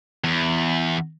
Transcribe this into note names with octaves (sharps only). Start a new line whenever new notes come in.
E2